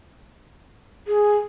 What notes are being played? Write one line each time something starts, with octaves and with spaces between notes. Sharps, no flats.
G#4